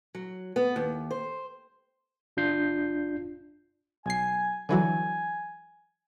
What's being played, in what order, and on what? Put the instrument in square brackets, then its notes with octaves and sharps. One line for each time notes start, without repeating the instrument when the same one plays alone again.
[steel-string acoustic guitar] F#3
B3
D#2
C5
[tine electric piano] G1 D4 F4 G6 C7
[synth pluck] B1 C7 [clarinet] G#5
[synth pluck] D3 E3 F#3 [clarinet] G#5